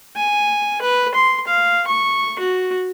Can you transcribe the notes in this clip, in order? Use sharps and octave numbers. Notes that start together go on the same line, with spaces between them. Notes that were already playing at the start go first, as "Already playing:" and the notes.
G#5
B4
C6
F5
C#6
F#4